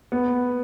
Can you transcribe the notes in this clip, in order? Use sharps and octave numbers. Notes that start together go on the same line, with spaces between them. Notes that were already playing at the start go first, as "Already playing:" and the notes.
B3